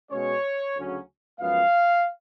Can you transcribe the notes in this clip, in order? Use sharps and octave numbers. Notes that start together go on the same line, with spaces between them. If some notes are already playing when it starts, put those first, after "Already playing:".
B2 G#3 C#4 C#5
D2 C#3 F#3 C#4
F#2 F3 G#3 B3 F5